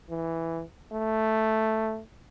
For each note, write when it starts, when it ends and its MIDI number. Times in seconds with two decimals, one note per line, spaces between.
0.10 0.62 52
0.93 2.01 57